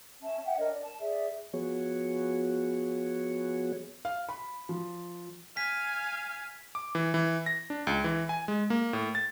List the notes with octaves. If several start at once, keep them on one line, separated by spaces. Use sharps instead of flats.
C#4 E5 A5
E5 F#5 G5
D4 A#4 C#5 D#5
D5
A5
G#4 D5 E5
F3 B3 F#4 G#4 C#5
F5
B5
F3
F5 G#5 B6
D6
E3
E3
A#6
D4
C#2
E3
G#5
G#3
A#3
A2
A6